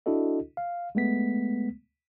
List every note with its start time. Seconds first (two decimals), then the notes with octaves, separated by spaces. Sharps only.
0.06 D4 E4 F#4 A4 D#5
0.57 F5
0.95 G#3 A3 B3 B6